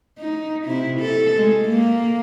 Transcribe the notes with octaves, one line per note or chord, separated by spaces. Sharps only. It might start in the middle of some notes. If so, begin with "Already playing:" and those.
D#4
C3 E4
A4
G#3
A#3